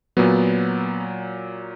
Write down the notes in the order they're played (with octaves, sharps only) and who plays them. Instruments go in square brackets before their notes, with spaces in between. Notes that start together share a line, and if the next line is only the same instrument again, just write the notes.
[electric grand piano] A#2 F#3 B3